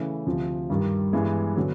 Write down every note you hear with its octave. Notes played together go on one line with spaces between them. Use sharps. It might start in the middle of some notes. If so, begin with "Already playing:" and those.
Already playing: C#3 E3 A3
D2 C3 F3
G2 D#3 G3
G2 E3 G#3 B3
D3 F#3 B3